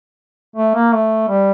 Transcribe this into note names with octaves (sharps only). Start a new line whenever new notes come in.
A3
A#3
A3
G3